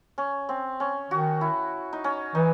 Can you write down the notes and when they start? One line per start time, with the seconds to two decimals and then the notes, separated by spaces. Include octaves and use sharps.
0.18 C#4
0.49 C4
0.80 C#4
1.11 D#3 F#4
1.41 E4
1.93 D#4
2.04 C#4
2.35 E3 D#4